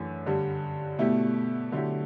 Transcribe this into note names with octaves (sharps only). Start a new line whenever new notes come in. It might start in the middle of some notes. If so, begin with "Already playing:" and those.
Already playing: F#2 E3 A3 D4 G4
G2 D3 G3
B2 A3 E4 G4
D3 F#3 A3 E4 G4